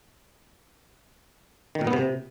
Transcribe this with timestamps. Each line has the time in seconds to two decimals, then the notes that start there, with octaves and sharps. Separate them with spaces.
1.75 D#3
1.81 A#2
1.87 B3
1.93 C3